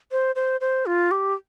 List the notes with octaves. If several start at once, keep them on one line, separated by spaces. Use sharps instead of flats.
C5
C5
C5
F4
G4